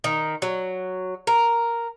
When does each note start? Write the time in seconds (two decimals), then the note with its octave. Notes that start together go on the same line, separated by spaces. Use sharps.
0.04 D#3
0.42 F#3
1.27 A#4